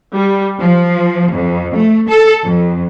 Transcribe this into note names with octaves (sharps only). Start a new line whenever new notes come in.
G3
F3
F2
A3
A4
F2